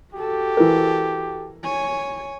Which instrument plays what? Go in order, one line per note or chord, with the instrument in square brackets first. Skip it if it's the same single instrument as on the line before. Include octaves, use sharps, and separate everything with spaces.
[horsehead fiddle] F#4 A4 [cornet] G4
[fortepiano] E3 A#4
[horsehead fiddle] C#5 G#5